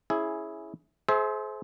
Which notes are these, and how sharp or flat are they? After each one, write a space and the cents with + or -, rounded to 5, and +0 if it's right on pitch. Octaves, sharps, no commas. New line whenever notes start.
C#4 +0 E4 -5 G#4 +10
G#4 +40 C5 +0 E5 -25